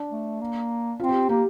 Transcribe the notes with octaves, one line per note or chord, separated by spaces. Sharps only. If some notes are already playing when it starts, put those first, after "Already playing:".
Already playing: D4
A3
A#3
C4 F4
G4
A#3 G4